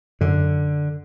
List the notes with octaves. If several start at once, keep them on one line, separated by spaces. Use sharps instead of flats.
F#2 D3